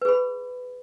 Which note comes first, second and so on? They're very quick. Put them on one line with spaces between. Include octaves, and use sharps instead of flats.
B4 G#4 B5